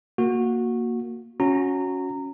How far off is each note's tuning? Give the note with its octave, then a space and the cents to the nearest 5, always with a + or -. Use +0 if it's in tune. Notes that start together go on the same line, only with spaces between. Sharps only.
A#3 +0 F#4 -15
C#4 +0 F#4 -15 A#5 -20